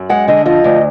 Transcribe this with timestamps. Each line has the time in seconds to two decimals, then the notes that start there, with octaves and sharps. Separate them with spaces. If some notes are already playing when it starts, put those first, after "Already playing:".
Already playing: F#2
0.10 G#3 F#5
0.28 D3 D#5
0.46 F3 D#5
0.64 D2